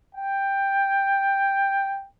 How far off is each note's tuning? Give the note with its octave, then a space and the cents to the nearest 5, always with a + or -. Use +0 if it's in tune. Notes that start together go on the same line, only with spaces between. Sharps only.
G5 +5